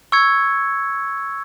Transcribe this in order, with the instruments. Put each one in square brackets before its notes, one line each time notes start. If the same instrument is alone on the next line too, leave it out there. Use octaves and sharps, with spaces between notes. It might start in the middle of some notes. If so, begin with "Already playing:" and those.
[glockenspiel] C#6 E6 G#6 C#7